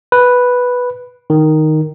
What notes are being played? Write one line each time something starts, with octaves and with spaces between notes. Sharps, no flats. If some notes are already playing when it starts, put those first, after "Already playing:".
B4
D#3